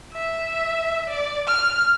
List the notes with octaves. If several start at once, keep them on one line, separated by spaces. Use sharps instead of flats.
E5
D5
F6